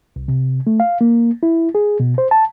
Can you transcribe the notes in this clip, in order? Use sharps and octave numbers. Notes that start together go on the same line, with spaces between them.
C2
C3
A3
F5
A#3
E4
G#4
B2
C5
A5